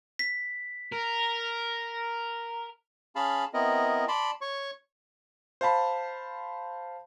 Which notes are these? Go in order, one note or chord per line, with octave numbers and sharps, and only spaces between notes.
B6
A#4
C#4 G#4 F5 A5 B5
B3 C4 E4 A#4 D#5
D5 A5 B5 C6
C#5 C#6
C5 F5 A5 B5